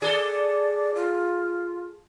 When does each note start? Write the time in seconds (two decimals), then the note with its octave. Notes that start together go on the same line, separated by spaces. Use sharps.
0.02 G#4 A4 D5
0.95 F4